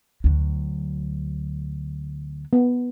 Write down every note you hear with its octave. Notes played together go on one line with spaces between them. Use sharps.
D2 F#3
B3